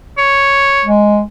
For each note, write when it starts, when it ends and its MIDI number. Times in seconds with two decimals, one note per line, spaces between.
0.18 0.86 73
0.85 1.22 56